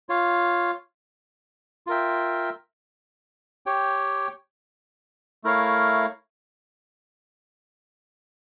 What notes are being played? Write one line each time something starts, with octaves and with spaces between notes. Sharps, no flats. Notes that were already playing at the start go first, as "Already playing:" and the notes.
F4 C#5 F5
F4 A#4 E5 G5
G4 C#5 G5
A3 E4 A#4 C#5 F5